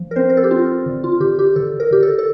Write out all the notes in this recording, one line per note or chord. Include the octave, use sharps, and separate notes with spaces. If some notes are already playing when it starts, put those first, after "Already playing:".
Already playing: F3
A#4
C4 C5
A#4
A4
G4
C4 F4
D3
F4
D3 G4
G4
D3 A4
A#4
D3 G4
A4
A4